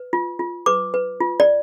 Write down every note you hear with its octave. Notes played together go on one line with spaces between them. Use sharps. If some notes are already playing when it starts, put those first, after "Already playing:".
Already playing: B4
F4
F4
B4 D6
B4
F4
D5